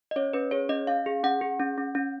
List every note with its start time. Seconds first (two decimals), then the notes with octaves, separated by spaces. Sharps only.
0.11 D#5
0.16 C#4 C#5
0.33 C#4 B4
0.51 G#4 C#5
0.69 C#4 D#5
0.87 C#4 F5
1.06 G#4
1.24 C#4 F#5
1.41 G#4
1.60 C#4
1.78 C#4
1.95 C#4